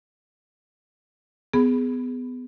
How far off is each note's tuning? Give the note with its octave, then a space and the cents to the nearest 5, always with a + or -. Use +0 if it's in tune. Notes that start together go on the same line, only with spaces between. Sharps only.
B3 +20 G#4 +0 B5 +0